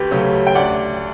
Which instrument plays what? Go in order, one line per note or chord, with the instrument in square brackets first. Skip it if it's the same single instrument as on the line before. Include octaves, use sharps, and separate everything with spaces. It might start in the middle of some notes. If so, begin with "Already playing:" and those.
Already playing: [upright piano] D2 G4 B4
C#3 F#3 A3 C#4
G5
D2 D5 F#5